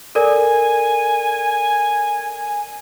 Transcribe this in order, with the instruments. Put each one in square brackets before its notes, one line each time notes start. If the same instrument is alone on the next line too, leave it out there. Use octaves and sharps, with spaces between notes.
[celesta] A4 A#4 D5 [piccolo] G#5